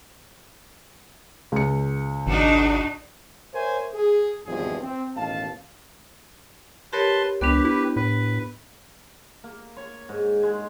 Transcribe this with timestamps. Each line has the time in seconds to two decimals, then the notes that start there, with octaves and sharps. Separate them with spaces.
1.52 C#2 C#7
2.27 G#1 D4 D#4 F#4
3.54 A#4 C5 C#5 E5 G#5
3.94 G#4
4.46 G#1 E2 G2 B2 F3 G#4
4.81 C4
5.15 A1 D#2 B2 F5 A5
6.93 G4 A#4 B4 C#5 A5 C6
7.41 C#2 B3 D4 G4 B4
7.65 E4
7.96 A2 B4
9.44 A#3
9.77 C#5
10.09 G#2
10.43 G#3